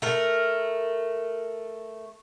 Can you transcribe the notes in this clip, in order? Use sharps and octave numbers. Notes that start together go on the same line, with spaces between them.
A3 A#4